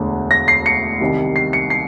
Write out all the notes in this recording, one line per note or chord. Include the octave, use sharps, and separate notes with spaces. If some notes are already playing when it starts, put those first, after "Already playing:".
Already playing: E1 D2 D3
A#6
C7
C#7
C2 C3 D#3 G3
C7
C#7
C7